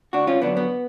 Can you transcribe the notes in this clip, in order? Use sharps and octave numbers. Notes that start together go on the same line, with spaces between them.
D2 D4 F#4
C#4 F4
D3 F#3 B3 D4
B3